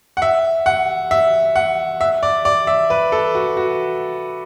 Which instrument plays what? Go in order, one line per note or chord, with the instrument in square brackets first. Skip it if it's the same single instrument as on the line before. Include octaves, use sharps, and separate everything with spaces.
[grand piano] F#5
E5
F#5
E5
F#5
E5
D5
D5
E5
B4
A4
F#4
F#4